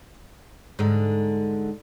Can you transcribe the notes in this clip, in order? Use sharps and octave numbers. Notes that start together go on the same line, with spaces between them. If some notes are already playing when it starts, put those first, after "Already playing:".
G#2 D3